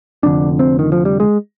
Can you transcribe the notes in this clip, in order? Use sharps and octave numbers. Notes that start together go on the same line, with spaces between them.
F1 F2 D3 D4
C4
D#3
F3
G3
G#3